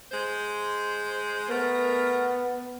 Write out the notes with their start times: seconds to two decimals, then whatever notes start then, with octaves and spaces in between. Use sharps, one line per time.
0.11 G#3 C5
1.50 A3 B3 A#4